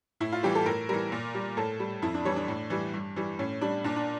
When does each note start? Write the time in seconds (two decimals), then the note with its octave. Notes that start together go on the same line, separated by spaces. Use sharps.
0.20 A2 E4
0.32 F4
0.43 E3 G3 G4
0.55 A4
0.66 A2 A#4
0.89 E3 G3 A#4
1.12 A#2
1.35 G3
1.57 A2 A4
1.80 G3
2.02 F2 E4
2.14 D4
2.25 E3 G3 C#5
2.36 D4
2.48 A2
2.70 E3 G3
2.94 G2
3.16 E3 G3
3.39 A2 C#4
3.61 G3 D4
3.84 A#2 D4
3.96 D4